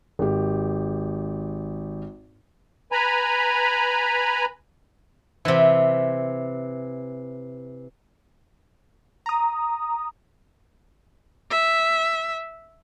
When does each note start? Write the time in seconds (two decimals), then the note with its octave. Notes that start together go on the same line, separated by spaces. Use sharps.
0.19 G#1 G4
2.92 B4 G#5 A#5 B5
5.45 C3 E3
9.26 A#5 D#6
11.51 E5